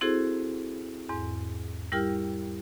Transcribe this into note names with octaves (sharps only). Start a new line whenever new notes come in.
C4 E4 F#4 G#4 A4 C5
E2 G#2
G3 E4 G4 A#4 G5 F6